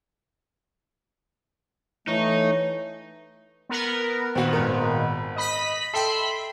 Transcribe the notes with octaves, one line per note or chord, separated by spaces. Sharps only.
E3 A3 D#4 C#5
B3 A#4 B4
A#2 D#3 B3 C4 F#4
G#1 A#4
D#5 B5 B6
A4 E5 G5 B5 C6